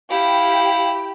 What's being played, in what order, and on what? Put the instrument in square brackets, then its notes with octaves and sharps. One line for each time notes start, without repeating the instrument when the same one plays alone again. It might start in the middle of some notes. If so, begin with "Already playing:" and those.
[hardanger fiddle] E4 [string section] G4 [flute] F5